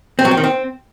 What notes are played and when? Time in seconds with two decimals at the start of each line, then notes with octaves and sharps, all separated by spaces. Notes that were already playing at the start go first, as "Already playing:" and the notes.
0.19 C4
0.25 F#3
0.31 C4
0.37 D#3
0.44 C4